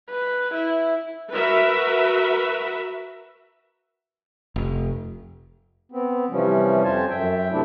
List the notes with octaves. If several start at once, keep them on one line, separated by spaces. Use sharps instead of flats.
B4
E4
F#4 A#4 B4 E5
F1
B3 C4
C3 E3 F3 G3 C#4
F2 C5 G#5 A5
F#2 E5 G5
C3 A3 C4 D4 E4